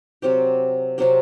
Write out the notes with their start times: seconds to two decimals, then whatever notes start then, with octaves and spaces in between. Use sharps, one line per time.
0.22 C3 F#3 C4 G4
0.98 C3 F#3 C4 G4